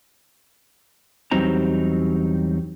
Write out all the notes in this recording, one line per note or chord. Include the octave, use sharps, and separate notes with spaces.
E2 F#3 G3 C4 D#4 A#5